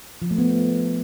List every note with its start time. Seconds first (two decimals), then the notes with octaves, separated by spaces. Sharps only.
0.22 F3
0.31 A3
0.38 B3